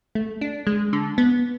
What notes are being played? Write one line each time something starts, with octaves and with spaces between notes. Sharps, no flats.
A3
D4
G#3
D3
B3